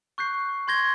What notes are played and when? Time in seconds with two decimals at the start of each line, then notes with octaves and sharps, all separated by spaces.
0.18 C#6 F#6 G6 C7
0.68 C6 G6 G#6 A#6 G7